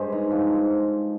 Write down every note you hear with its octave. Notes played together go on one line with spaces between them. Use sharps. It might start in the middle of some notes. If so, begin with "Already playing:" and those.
Already playing: G2 G#3 G#4 C5
D#4
F3